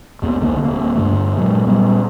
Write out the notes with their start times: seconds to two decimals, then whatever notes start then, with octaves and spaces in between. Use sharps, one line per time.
0.22 A1 E2 A#3 B3
0.40 C2 D3 A3 A#3
0.65 D1 A#3
0.95 G2 D3 A3
1.37 A#2 F#3 G#3
1.67 A#2 G3 B3